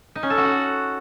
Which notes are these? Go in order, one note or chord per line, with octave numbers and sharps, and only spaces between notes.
D#4
C#4
A4
F#4
F#5